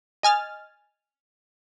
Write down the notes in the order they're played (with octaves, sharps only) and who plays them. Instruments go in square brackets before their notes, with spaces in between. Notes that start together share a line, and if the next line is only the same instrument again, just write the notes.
[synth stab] D#5 G#5 F6 A6